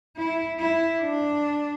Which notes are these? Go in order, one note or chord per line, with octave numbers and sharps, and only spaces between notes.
E4
E4
D4